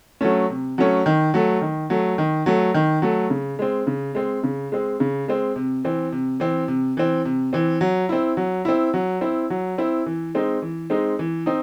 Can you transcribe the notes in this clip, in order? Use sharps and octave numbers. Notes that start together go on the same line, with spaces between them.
F#3 A3 C#4
C3
F#3 A3 C#4
D#3
F#3 A3
D#3
F#3 A3
D#3
F#3 A3
D#3
F#3 A3
C#3
G#3 C4
C#3
G#3 C4
C#3
G#3 C4
C#3
G#3 C4
C3
E3 C4
C3
E3 C4
C3
E3 C4
C3
E3 C4
F#3
C4 E4
F#3
C4 E4
F#3
C4 E4
F#3
C4 E4
E3
G#3 C4 D#4
E3
G#3 C4 D#4
E3
C4 D#4